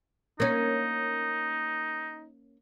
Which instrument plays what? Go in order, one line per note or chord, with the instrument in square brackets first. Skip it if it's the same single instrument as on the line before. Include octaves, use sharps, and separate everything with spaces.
[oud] A#3 C#4 [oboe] D#4